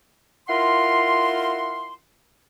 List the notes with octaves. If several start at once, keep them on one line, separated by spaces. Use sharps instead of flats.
E4 F4 A#4 F#5 C6